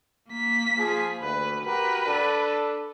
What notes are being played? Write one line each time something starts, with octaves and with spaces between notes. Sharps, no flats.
A#3 B6
F3 G#4
D2 B4
F#4 G4 A#4 B4
D4 A4